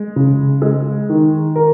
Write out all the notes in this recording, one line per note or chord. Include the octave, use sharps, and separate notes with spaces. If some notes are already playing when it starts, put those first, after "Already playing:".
Already playing: G#3
C#3
G#3
D#3
A#4